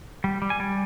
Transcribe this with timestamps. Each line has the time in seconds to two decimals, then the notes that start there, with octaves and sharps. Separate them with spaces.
0.24 G3
0.42 G3
0.50 G#5
0.60 G3